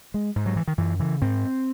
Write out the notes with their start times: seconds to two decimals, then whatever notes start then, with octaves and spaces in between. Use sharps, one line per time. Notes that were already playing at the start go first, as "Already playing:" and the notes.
0.14 G#3
0.36 G#2
0.46 F#3
0.56 E3
0.67 D#3
0.78 F#2 E3
0.99 C#3 E3
1.22 G#2 C4